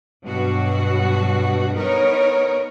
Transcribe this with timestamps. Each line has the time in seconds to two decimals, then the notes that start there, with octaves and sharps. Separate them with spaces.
0.24 G2 B2 F#3 F#4
1.76 B3 D#4 A#4 C#5